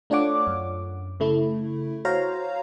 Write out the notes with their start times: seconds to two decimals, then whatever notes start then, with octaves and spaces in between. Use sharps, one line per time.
0.10 A3 D4 F4 C#5 F#5 D6
0.47 F#2
1.20 C#3 A3 E4
2.05 F#4 C5 C#5 F5 A#5